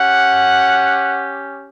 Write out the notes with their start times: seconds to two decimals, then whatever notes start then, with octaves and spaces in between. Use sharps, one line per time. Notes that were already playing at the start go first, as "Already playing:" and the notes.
Already playing: C#4 G4 F#5